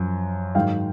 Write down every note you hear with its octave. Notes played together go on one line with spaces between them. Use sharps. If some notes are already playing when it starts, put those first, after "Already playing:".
Already playing: F#2 F3
G#2 D#3 F#3 F5 G5